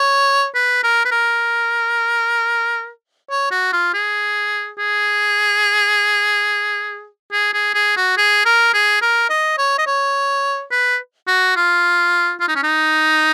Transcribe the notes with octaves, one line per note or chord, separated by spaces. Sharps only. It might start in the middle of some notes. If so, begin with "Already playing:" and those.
Already playing: C#5
B4
A#4
B4
A#4
C#5
F#4
F4
G#4
G#4
G#4
G#4
G#4
F#4
G#4
A#4
G#4
A#4
D#5
C#5
D#5
C#5
B4
F#4
F4
F4
D#4
C#4
D#4